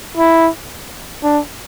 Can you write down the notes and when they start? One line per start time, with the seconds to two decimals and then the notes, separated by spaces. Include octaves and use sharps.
0.17 E4
1.24 D4